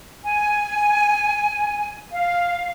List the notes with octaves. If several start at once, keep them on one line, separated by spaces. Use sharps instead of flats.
G#5
F5